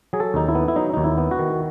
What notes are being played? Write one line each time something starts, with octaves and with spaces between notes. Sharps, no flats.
F#3 G#4
A4
D#2 D#4
E4
B3
E4
F#3 D#4
D#2 D#4
E4
B3
F#4
D#3